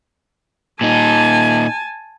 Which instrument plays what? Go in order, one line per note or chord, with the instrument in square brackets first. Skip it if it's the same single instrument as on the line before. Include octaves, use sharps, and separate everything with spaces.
[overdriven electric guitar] A#2 D#4 [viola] G#5 A5